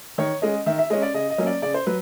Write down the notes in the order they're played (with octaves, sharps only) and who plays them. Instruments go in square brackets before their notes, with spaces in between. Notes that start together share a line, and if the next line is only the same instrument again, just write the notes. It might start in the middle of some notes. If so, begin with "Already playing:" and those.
[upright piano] D#3 C#5
G#3 C#4 D#5
D#3 E5
E5
G#3 C#4 D#5
D5
C#3 D#5
D#5
F#3 A#3 C#4
D5
C#3 D5
C5
F#3 B4